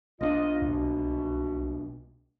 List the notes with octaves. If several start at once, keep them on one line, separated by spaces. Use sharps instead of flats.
B1 C4 D4 F4 D#5
C2 B2